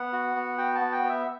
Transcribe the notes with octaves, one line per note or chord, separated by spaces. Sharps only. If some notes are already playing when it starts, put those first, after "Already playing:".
Already playing: B3 F#5
F#4
B3
F#4 G5
A5
B3
G5
B3
E5